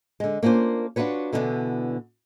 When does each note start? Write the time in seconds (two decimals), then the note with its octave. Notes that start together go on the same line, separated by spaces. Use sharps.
0.20 D3 G#3
0.43 A#3 C#4 D4 F4 C5
0.96 D4 F4 F#4 B4 C#5
1.32 B2 D3 E3 G3 B3 D4